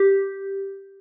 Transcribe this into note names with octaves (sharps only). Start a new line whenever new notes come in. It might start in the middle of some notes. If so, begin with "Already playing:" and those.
Already playing: G4